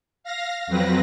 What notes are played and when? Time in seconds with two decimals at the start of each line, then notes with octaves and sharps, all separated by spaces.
0.24 F5 A#6
0.67 F2 F#3 C4 B4 A#6